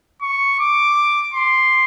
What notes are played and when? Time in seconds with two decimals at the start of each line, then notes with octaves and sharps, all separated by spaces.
0.22 C#6
0.59 D6
1.34 C6